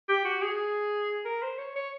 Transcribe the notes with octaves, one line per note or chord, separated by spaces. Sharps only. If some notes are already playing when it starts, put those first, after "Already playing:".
G4
F#4
G#4
A#4
C5
C#5
C#5